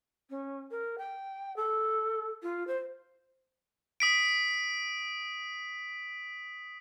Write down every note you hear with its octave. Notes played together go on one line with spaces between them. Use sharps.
C#4
A#4
G5
A4
F4
C5
D#6 B6 D7